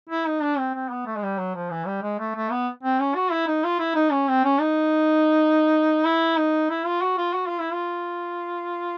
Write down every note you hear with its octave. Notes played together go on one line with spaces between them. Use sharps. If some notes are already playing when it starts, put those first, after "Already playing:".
E4
D#4
D4
C4
C4
B3
A3
G#3
G3
F#3
F3
E3
G3
G#3
A3
A3
B3
C4
C#4
F#4
E4
D#4
F4
E4
D#4
C#4
C4
C#4
D#4
E4
D#4
E4
F4
F#4
F4
F#4
F4
E4
F4